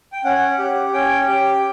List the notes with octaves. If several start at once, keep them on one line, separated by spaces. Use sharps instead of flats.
G5
C#4 F#5
G4
C#4 G5
G4